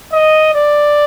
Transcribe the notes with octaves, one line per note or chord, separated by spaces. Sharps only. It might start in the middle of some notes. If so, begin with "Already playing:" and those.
D#5
D5